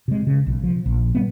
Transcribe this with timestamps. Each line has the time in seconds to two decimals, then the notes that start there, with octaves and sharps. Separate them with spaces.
0.08 C3 G#3
0.27 C#3
0.46 B1
0.64 F3
0.86 A#1
1.15 G3 A3 B3